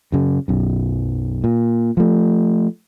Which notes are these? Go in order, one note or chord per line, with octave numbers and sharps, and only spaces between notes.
F#2 C#3
B1 F#2
A#2
F3 A3